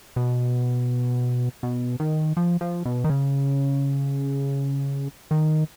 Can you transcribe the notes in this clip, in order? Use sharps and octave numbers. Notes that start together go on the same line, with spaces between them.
B2
B2
D#3
F3
F3
B2
D#3
C#3
D#3